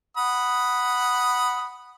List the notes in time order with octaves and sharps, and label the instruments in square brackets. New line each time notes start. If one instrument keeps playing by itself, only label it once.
[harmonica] F#5 B5 D#6